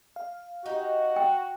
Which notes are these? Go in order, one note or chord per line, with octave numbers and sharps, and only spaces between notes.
F5
D#4 F#4 G4
G5